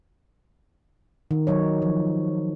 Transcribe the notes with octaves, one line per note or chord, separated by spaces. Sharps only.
D#3
F#3 D#4 C#5
F3